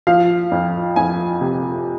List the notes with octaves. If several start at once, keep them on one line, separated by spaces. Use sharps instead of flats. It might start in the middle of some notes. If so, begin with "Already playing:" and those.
F3 F5
F2
F2 G#5
C3